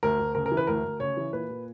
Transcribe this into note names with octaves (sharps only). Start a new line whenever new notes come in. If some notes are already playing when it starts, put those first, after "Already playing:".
D2 A#4
D2
C#3 A#4
A#4
E3
B4
D2 A#4
D2
C#3 C#5
E3
A#2 B4
A#2